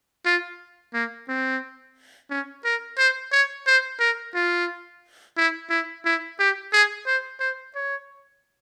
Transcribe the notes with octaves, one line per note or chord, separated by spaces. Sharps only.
F4
A#3
C4
C#4
A#4
C5
C#5
C5
A#4
F4
E4
E4
E4
G4
G#4
C5
C5
C#5